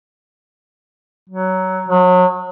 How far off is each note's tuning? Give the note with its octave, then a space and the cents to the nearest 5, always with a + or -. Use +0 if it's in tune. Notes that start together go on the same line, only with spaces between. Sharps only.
F#3 +15
F#3 -30